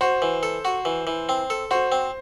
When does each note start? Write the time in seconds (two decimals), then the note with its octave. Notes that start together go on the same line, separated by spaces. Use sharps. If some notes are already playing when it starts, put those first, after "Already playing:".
0.01 F#4 C5
0.22 E3
0.43 A4
0.65 F#4
0.85 E3
1.07 E3
1.29 C4
1.50 A4
1.71 F#4 C5
1.92 C4